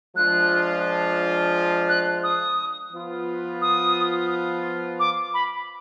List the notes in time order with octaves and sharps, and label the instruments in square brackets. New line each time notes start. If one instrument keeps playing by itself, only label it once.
[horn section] F3 G#3 D4 F4 [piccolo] F#6
[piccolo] F#6
D#6
[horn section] F3 B3 F4 B4
[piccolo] D#6
D6
B5